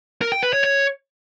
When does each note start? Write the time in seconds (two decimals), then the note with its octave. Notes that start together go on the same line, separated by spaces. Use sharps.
0.21 A#4
0.32 G5
0.43 B4
0.53 C#5
0.64 C#5